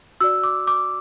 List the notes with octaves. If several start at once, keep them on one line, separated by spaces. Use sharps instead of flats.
F#4 D5 E6
D6
D6